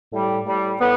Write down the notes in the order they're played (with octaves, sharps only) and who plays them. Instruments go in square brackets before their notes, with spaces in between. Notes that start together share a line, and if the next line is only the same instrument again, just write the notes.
[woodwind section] A2 G3
A2 G3
A2 B3